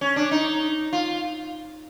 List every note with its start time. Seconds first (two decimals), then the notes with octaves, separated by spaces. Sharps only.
0.01 C#4
0.16 D4
0.31 D#4
0.93 F4